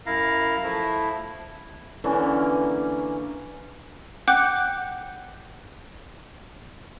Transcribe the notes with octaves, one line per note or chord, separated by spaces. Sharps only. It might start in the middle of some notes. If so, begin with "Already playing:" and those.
F#2 E4 F5 A#5
F3 A3 E4
D3 E3 A#3 C#4
F#5 G5 D6 F#6 G6